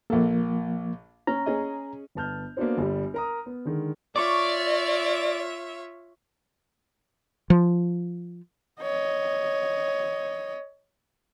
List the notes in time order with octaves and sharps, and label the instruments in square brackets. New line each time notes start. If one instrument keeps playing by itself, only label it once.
[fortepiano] A#1 A4 [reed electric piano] F3 A#3
[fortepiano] C#4 [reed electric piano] A#5
[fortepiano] C#4 G#4 D#5
[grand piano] G1 B3 A5 F6 G6
A#3 B3 D4 F#4 C5
G1 G3
A#4 A#5 D#6
B3
D3 D#3 G#3
[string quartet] F4 C#5 E5 [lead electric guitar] D5 [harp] C#6 D6
[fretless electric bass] F3
[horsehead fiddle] C#5 D#5